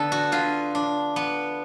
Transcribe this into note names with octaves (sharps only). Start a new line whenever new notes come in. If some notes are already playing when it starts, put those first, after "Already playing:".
Already playing: D3 B3 A4
F#4
D3 F4
D4
B3